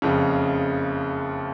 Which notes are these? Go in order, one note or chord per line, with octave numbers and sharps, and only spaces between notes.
F#1 F2 C#3